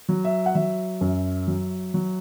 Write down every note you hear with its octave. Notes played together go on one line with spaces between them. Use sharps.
F#3
E5
F#5
F#3 E5
F#2
F#3
F#3